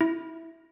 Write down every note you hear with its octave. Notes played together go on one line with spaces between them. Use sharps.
E4